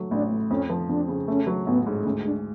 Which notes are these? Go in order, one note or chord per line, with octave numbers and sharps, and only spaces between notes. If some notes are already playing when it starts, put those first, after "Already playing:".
Already playing: F#3 A3
A1 D4
A2
F2 C#4
F3
F2 D4
C#3
A3 C#4
F#3
A1 B3
G#2
D2 C#4
G#3 D4